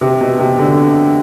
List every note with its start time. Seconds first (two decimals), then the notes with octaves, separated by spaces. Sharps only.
0.01 C3
0.21 B2
0.39 C3
0.59 D3